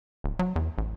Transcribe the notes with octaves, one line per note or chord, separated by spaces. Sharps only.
D1
F#3
E2
A1